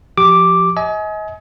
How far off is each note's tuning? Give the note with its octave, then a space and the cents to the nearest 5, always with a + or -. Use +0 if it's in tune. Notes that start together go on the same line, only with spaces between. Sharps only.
F3 +0 G4 -15 D6 +0
D#5 +35 G#5 +30